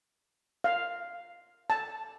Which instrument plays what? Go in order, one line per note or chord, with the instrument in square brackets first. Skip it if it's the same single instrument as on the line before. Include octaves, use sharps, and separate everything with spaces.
[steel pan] F5
A5